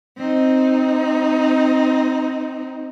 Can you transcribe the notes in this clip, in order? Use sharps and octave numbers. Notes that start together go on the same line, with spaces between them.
C4 D#4